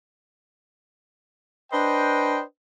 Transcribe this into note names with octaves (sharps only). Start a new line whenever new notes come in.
D4 B4 C5 D#5 G5